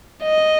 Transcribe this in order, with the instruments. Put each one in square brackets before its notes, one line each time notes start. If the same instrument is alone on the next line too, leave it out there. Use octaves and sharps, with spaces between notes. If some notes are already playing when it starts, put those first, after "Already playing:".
[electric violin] D#5